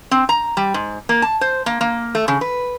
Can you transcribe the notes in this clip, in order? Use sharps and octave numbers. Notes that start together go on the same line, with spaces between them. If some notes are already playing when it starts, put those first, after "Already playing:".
C4
A#5
G3
G#2
A#3
A5
C5
A#3
A#3
A3
C#3
B4